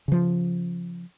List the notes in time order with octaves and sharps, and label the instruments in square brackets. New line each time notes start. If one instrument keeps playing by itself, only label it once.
[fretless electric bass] C#3 F3